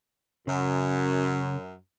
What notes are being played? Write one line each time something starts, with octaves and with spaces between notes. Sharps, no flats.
F#2 C#3